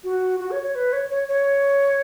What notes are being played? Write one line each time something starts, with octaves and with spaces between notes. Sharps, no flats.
F#4
F#4
C#5
C#5
B4
C#5
C#5
C#5